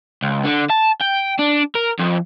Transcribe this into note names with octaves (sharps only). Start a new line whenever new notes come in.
C#2
D3
A5
G5
D4
A#4
F2